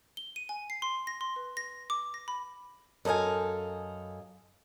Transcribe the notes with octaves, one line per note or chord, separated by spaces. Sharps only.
G7
D#7
G#5
C7
C6
A#6
C6
B4
A#6
D6
A#6
B5
F#2 A4 D#5 F5 G#5